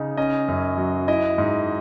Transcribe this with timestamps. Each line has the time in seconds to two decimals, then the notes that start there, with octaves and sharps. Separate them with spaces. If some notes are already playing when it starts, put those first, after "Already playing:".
Already playing: C#3 D#4
0.17 C#4 D#5
0.48 F#2
0.78 F#3
1.08 E4 D#5
1.38 G#2